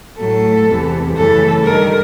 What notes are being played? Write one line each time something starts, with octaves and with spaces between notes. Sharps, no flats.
A2 F#3 A3 A4
E2 C3 E3
F#2 C#3 E3 A3 A4
G2 D#3 G3 A#4